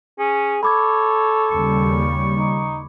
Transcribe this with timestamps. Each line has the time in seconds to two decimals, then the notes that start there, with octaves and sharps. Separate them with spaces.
0.19 C#4 G#4
0.63 A4 C#5 B5 D6 G#6
1.51 D#2 C#3 G3 C#6
2.37 D#4